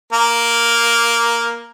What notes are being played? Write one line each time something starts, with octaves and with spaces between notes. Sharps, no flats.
A#3 A#4